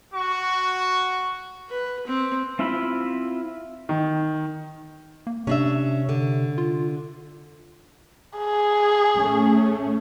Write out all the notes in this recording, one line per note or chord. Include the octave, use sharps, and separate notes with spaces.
F#4 C#6
B4
C4
C4 E4 F4 E5 B5
D#3
A#3
C3 C#4 D4 E5
D3
F4
G#4
A3 C#4